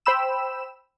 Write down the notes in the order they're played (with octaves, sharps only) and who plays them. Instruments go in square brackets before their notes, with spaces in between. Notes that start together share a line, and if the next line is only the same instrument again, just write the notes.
[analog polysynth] C5 G5 B5 E6 E7